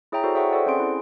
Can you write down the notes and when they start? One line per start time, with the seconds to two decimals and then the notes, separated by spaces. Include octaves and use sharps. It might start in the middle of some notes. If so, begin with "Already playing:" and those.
0.12 E4 G#4 C#5 E5 G5 A#5
0.23 E4 F#4 G#4 A4 C5 D5
0.35 G#4 C#5 E5 F#5 G5 C#6
0.51 A4 C5 D5 F#5
0.66 C4 C#4 G#4 C6 D7
0.80 E4